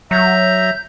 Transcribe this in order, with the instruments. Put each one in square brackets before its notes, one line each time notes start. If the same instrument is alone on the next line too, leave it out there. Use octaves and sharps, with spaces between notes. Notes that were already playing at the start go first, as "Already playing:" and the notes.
[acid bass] F#3 [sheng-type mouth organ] E5 A#5 [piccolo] G6